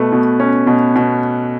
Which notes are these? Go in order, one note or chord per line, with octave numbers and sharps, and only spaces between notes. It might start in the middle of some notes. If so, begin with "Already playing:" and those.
Already playing: B2 A3 B4
B2
C#4
B2
B2